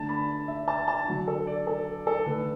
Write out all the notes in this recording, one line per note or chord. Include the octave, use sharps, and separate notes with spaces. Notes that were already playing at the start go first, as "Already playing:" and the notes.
Already playing: D3 A3 D4 A5
B5
E5
A5
A5
D3 F#3 D4 F#4
A4
D5
A4
A4
D3 A3 D4 B4